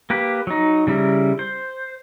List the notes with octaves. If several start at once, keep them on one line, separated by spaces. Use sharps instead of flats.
A#3 G4 B4
F#3 D#4
C#3 G3 E4 A#4
C5